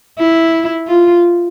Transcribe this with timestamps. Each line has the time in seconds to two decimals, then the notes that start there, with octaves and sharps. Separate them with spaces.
0.19 E4
0.88 F4